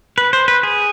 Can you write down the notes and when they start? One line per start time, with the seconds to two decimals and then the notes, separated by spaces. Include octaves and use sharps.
0.18 B4
0.33 C5
0.48 B4
0.63 G#4